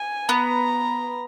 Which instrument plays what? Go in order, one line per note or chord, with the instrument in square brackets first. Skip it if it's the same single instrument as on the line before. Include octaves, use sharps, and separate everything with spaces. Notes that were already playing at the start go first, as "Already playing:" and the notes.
Already playing: [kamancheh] G#5
[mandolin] B3 [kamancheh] A#5